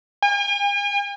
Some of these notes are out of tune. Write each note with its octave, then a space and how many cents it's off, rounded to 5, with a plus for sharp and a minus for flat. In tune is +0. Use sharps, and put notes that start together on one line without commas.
G#5 -45